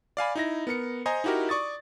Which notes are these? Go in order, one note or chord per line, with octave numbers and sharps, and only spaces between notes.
D5 F5 G#5 B5
D#4 E4 A#6
B3 A#4 C#7
C5 D#5 G#5 A#5
D#4 E4 F#4 G4 A#4
D5 C#6 D#6 A6